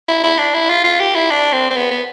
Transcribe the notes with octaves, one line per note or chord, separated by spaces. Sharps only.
E4
E4
D4
E4
F4
F4
G4
E4
D4
C4
C4
B3
B3